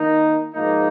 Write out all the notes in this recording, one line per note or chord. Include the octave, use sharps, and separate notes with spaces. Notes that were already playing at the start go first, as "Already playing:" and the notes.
Already playing: D#3 A#3 D#4
G#2 F3 A#3 D#4